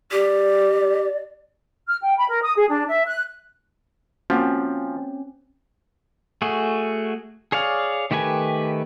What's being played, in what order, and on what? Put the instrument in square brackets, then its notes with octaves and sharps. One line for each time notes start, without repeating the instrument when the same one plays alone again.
[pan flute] G4 [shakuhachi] D5
[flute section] F6
G5
B5
A#4
D#6
G#4
D4
E5
F#6
[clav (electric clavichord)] F3 [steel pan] A#3 F#4 [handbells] C4 C#4
[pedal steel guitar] A3 F#4 G#4
G#4 C#5 D5 F5
D#3 A3 G4 B4 G#5